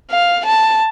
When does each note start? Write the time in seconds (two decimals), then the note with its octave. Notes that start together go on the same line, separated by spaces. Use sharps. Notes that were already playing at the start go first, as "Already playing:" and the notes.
0.11 F5
0.46 A5